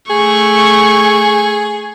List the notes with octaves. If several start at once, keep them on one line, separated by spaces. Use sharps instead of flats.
A3 G#4 C#6